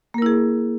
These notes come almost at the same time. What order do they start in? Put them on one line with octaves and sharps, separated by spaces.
A#3 A#4 E4 G#4